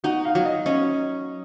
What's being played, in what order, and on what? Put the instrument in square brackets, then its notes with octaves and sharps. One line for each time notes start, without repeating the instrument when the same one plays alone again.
[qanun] D#4 [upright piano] F#4 F#5
[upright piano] F5
[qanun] F#3
[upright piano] D#5
[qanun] C#4 [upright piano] D#5